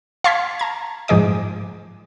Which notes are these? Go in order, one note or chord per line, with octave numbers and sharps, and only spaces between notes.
F5 A5 C6 C#6 G#6 B6
A5 A#5 G#6
G#2 F3 G#4 D#5 D6